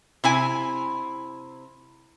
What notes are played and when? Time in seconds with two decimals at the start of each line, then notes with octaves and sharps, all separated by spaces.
0.24 C3 E4 G#5